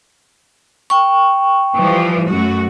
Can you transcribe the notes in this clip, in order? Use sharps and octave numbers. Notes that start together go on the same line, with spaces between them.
G5 C#6
E3 F3 G3
F#2 A3 F#4